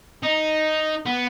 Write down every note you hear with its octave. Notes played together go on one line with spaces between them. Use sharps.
D#4
B3